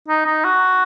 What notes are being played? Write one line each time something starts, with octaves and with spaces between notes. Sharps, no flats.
D#4
D#4
F#4